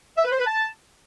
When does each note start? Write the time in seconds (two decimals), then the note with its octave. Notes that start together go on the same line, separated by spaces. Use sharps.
0.16 E5
0.24 B4
0.31 C5
0.39 B4
0.47 A5